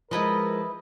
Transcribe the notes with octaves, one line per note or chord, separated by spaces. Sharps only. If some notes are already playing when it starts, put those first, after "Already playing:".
F3 G#3 E4 A#4 B4 D#5